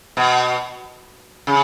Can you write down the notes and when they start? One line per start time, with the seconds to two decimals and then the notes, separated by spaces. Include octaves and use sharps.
0.17 B2
1.47 C#3